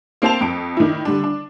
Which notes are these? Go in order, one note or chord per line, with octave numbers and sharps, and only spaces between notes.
A#3 C4 C5 A5 F7
F2 D7
D#3 D4 E4
D3 G3 D4
D4